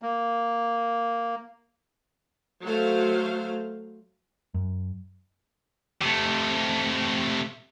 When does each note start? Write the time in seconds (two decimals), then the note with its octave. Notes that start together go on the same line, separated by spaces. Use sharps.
0.02 A#3
2.63 F#3 A3 C5 F5
4.54 F#2
6.01 C3 A3